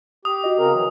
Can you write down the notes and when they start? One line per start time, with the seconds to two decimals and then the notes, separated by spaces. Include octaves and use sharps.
0.25 G4 D#6
0.44 F#4 D#5
0.58 C#3 C4 A#4
0.73 E3 F#3